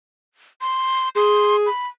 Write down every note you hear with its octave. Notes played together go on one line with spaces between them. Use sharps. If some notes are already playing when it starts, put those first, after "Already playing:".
C6
G#4 C6
B5